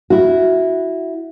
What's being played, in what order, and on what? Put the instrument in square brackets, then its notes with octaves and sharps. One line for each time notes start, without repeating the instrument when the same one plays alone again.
[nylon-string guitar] E4 F#4